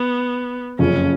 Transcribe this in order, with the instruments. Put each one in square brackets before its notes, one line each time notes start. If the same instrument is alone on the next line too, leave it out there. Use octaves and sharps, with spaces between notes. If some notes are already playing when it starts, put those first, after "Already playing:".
Already playing: [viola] B3
[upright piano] F#1 F2 C#3 [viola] C#4